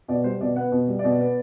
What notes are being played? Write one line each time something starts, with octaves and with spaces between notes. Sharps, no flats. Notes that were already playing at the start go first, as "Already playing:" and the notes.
B2 D5
G3 C5
B2 D5
B3 F#5
B2
G3
D5
B2
B3